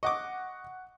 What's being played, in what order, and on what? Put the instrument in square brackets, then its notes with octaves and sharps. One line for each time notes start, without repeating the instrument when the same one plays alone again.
[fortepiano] D#5 D6 [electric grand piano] F#5 C#6